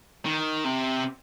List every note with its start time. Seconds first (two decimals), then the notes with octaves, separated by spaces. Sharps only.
0.26 D#3
0.64 C3